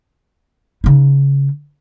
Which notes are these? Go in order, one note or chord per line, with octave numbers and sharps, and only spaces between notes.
C#3 D#4